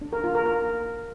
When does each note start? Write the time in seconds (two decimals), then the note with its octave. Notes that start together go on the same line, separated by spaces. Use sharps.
0.01 D4
0.13 A#4
0.24 F4
0.35 A#4
0.46 A#4